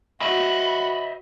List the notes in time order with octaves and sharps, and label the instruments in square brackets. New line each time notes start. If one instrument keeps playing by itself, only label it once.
[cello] F#4 [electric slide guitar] C5 D#5 E5 [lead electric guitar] B5